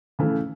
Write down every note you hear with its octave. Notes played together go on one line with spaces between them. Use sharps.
C#3 E3 A3